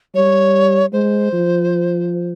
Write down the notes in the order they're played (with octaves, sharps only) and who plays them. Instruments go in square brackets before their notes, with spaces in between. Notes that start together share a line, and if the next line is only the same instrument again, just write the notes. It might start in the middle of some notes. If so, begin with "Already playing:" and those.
[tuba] G3 [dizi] C#5
[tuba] G#3 [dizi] C5
[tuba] F3